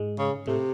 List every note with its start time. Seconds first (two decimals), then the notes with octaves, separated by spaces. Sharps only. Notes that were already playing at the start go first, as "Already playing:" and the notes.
Already playing: G#2 G#3
0.19 C#3
0.47 A2 C3 A3